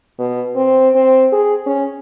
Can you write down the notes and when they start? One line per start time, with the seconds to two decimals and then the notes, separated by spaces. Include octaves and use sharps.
0.19 B2
0.56 C4
0.95 C4
1.32 G#4
1.66 C#4